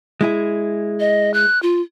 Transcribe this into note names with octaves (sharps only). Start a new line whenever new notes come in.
G#3 E4 G#4
D#5
F#6
F4